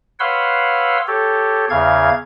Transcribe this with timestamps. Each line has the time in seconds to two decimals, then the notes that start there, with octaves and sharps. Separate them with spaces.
0.20 B4 C#5 F5 F#5 C6 E6
1.07 G4 A4 C#5
1.70 E2 C#3 F5 G#6